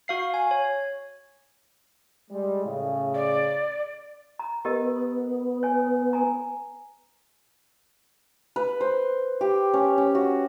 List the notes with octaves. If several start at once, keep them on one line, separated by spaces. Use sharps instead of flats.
F#4 F5 C7
G#5
C#5
G3 G#3
A2 C#3
D5
A#5
B3 G4 A#4 D#5
C#5 G#5
G#5 A#5
B4
C5
G4
C#4
C#4
F#4